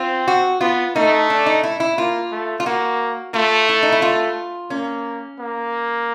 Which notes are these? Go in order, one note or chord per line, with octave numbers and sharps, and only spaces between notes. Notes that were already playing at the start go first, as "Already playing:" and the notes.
Already playing: C4 F4
F#4
B3 F4
A3 D#4
D4
D#4
E4
E4
A#3 F4
A3
F4
A#3 F#4
A3 F4
E4
D#4
E4
F4
A#3 C#4
A#3